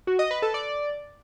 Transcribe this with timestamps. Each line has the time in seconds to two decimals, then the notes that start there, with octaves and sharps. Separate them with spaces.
0.07 F#4
0.19 D#5
0.31 B4
0.42 A4
0.54 D5